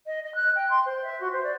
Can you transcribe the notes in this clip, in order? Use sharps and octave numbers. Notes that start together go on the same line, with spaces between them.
D#5
D#5
F#6
G5
C6
C5
E5
F#4
C5
D5